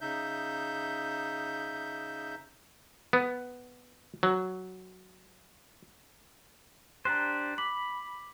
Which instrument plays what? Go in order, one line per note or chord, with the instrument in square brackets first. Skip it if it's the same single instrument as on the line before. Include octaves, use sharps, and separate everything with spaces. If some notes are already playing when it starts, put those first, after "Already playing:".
[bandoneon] C#3 D#4 E5 G6
[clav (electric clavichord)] B3
F#3
[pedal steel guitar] D4 G4 C5 [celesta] A#5 F#6
[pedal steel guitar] B5 [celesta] D6 B6 F#7